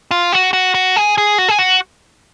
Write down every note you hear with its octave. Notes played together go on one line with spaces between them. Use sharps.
F4
F#4
F#4
F#4
G#4
G#4
F#4
G#4
F#4